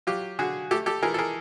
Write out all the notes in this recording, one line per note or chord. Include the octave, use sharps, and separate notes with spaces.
F#3 F4 G4
D3 F#4 G#4
A3 G4 A4
G4 A4
E3 G#4 A#4
A4
G#4 A#4